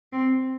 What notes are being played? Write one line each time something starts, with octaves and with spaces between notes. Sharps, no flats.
C4